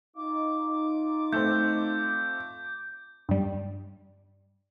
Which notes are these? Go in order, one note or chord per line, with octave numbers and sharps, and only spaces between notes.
D#4 F4 D6
A3 C4 G6
G2 G3